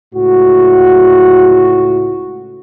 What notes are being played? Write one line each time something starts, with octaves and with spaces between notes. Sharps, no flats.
C#2 A2 F#4